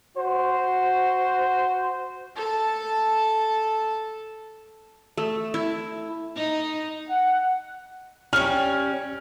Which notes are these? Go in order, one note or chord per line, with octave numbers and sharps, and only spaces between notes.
F#4 C5
A4 A5
A3
E4
D#4
F#5
G3 C#4 F6